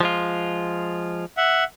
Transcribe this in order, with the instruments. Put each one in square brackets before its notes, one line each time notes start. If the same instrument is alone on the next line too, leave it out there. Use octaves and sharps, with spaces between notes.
[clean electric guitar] F3 G#3 F4
[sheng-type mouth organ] E5 F#5